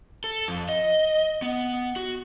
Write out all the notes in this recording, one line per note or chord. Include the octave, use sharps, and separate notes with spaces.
A4
F2
D#5
B3
F#4